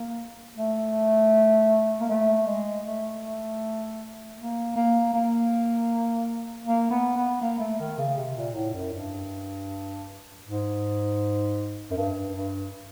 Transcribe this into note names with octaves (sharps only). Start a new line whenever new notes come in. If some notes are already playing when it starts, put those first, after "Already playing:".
Already playing: A#3
A3
A#3
A3
G#3
A3
A#3
A#3
A#3
A#3
B3
B3
A#3
A3
D#3
C#3
C3
A#2
A2
F#2
G2
G#2
F#2
G2
G2